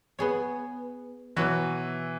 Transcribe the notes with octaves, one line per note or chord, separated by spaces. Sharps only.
B3 G#4 C#5
B2 E3 F#3 B3 F#4